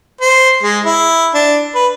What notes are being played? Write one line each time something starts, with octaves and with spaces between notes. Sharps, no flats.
C5
G#3
E4
D4
B4